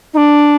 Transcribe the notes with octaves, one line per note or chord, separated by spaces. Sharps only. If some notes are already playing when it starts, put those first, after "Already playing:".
D#4
D4